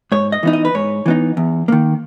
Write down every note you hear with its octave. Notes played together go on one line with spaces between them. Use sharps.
G#2 C#5
D#5
E3 B3 D#4
D#5
B4
G#2 C#5
E3 B3 D#4
E2
D#3 A#3